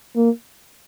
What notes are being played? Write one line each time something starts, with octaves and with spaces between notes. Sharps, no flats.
A#3